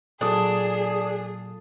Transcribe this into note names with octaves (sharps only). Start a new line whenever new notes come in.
A#2 F#3 D4 G#4 A4 D#6